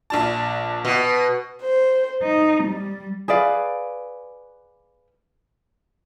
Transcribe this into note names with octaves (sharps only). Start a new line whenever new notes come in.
A#1 D4 A5
B2
C5
D#4
G3
G#4 B4 D5 F5